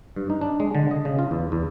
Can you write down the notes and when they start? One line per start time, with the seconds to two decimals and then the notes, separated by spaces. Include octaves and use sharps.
0.16 G2
0.30 D#4
0.41 D4
0.60 G#3
0.75 D3
0.91 D#5
1.05 C#3
1.19 F4
1.31 E2
1.52 E2